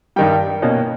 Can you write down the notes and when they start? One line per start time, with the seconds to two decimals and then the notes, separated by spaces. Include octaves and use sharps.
0.16 G2 D#3 G3 G5
0.62 B2 A#3 C#4